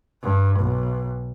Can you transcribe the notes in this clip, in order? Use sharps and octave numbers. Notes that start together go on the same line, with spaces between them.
G2
B1